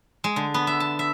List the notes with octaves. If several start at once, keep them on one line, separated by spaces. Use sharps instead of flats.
G#3
D3
B3
E5
A5
E5